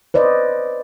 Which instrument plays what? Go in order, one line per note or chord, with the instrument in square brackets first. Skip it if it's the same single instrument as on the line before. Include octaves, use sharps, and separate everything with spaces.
[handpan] B4 C5 D5 D#5